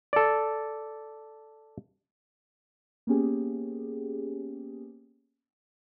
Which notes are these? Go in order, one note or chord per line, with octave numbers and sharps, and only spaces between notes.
A4 D5
A#3 B3 C#4 G4 G#4